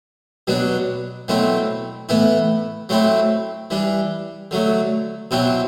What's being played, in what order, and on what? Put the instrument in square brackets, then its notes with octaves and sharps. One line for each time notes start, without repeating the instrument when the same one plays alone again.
[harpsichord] B2 F#3 B3 D4
B2 F#3 A3 C4 E4
A2 E3 B3 E4
F#3 A3 C4 E4
E3 G3 D4
D3 F#3 A3
B2 F#3 C4 E4